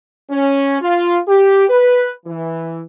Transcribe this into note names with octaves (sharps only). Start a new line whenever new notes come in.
C#4
F4
G4
B4
E3